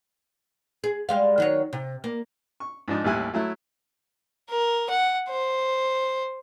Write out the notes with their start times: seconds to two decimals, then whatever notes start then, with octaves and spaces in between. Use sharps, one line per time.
0.84 G#4
1.09 G3 G#3 F5
1.38 D#3 F#3 C#5
1.73 C3
2.04 A#3
2.60 C#6
2.88 G#2 F3 D4 D#4
3.04 A1 D#2 G3 E4 G#5 F#6
3.34 F#3 A3 E4
4.50 A#4
4.90 F#5
5.29 C5